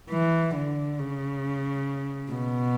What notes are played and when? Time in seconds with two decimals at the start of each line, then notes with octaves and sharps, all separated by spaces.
0.10 E3
0.55 D3
0.99 C#3
2.32 B2